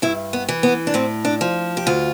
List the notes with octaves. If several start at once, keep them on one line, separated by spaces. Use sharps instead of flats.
G2 E4
B3
E3
B3
D4
A2 C4
D4
F3
G4
D2 F4